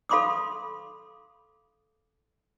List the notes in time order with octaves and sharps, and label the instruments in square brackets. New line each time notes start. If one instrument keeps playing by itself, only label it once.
[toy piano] A4 F5 B5 C6 D6 D#6